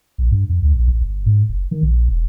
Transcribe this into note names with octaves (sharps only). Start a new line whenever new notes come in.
A#1
G2
F2
D2
A#1
A1
G1
G#2
F#1
D#3
A#1
E1